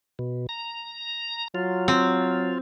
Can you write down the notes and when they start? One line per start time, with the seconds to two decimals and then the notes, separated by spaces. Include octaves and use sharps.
0.19 B2
0.49 A#5
1.55 F#3 F4
1.88 C4